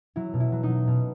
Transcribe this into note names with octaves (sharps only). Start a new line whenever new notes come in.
F#3 E4
B2
E4
F#3
D#4
F#3
B2